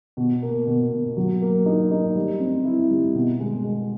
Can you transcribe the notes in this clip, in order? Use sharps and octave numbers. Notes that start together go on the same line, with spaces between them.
B2
A#3
B2
B2
F#3
A#3
D#4
D#4
G3
C4
E4
G3
B2
G#3
G#3